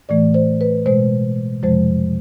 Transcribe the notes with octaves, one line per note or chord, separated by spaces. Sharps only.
A2 E3 A3 D5
C5
B4
B2 G#3 C5
F2 C3 F3 G#3 C5